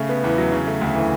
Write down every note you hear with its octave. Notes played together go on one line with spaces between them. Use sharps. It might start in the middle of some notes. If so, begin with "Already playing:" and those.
Already playing: C#3 A3
B3
E2
F#3
C#3
A3
D2
E3